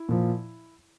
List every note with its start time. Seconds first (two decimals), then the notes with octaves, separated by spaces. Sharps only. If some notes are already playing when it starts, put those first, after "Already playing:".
Already playing: E4
0.09 A#2 F3